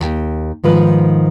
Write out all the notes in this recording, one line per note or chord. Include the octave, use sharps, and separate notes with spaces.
D#2 G5
G#2 D#3 F3 B4